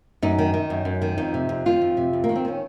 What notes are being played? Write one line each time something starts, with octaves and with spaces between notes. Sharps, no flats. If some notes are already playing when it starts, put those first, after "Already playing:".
F#2 D#4
D#3
D#3
F#2
F#2
D#3
F2 D#4
C3
F2
D#3 F4
F2
C3
F2
A#3
D#3
C4
D#3 C#4